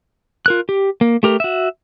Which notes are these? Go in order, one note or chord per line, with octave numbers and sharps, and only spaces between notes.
F4 A#4 F#6
G4
A#3
A3 G4 A#4
F#4 E5